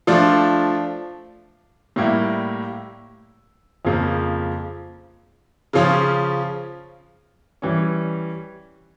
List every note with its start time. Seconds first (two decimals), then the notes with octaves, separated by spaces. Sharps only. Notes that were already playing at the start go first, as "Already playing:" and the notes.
0.07 F3 A3 D4 F4
1.96 A2 G3 A#3 E4
3.85 F2 C#3 F3 A#3
5.73 C#3 F3 C#4 F4
7.62 E3 G3 C#4